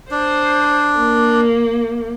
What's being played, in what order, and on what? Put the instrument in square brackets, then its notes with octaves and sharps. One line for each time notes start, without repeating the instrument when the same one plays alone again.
[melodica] D4 [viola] C5
[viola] A#3